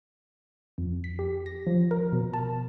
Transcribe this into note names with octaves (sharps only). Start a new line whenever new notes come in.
F2
B6
G4
A#6
F3
A#4
B2
A5